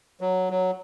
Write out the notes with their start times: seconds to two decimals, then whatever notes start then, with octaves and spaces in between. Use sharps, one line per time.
0.21 F#3
0.50 F#3